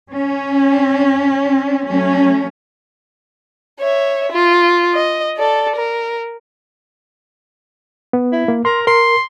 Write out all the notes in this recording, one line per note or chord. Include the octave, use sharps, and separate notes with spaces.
C#4
F#3 A3 C#4
C#5 E5
F4
D#5
A4 D5
A#4
B3
E4
A#3
A#4 C6
A#4 C6